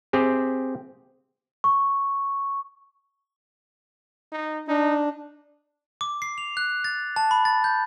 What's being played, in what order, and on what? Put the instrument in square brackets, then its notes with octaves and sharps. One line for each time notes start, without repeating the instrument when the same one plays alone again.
[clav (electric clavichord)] C4 G4 G#4
[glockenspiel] C#6
[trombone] D#4
[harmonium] D4 [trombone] D#4
[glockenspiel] D6
C7
F7
F#6
A6
A5
B5
A6
G6